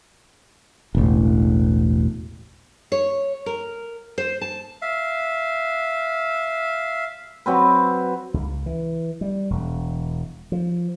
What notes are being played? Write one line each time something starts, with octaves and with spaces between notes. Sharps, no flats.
E1 A1
C#5
A#4
C5
A5
E5 F5
F#3 C4 B4
C#2
E3
G3
E1
F3